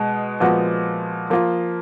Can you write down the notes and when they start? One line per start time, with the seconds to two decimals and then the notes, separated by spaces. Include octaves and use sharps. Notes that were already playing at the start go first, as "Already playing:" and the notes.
Already playing: B2 G#3
0.40 A#2 F3 G#3 B3 F#4
1.30 F3 A#3 F4